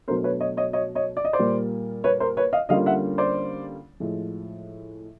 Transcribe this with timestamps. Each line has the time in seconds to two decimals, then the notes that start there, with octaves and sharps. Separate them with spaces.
0.08 B2 F#3 A3 D4 A#4 C5
0.24 B4 C#5
0.40 C#5 D#5
0.57 C#5 D#5
0.73 C#5 D#5
0.95 C#5 D#5
1.17 D5
1.25 D#5
1.33 C5 D5
1.39 A#2 G3 A#3
2.04 B4 C#5
2.20 A#4 C5
2.37 B4 C#5
2.53 D#5 F5
2.69 D3 G3 A#3 C#4 F4 D#5 F5
2.86 E5 F#5
3.18 C5 D5
4.00 A2 F3 G#3